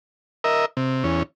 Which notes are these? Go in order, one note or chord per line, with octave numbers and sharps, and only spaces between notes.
A#4 D#5 E5
C3
E2 C#4